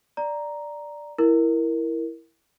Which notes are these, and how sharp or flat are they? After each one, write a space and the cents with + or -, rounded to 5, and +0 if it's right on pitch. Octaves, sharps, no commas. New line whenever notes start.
D5 +0 A#5 +0
E4 +5 A#4 +0